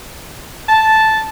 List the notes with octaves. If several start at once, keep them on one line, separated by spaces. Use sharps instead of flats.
A5